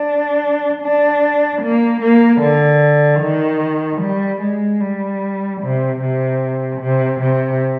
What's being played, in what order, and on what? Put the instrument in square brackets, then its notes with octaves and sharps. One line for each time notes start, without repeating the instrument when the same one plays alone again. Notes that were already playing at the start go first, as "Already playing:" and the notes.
Already playing: [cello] D4
D4
A#3
A#3
D3
D#3
G3
G#3
G3
C3
C3
C3
C3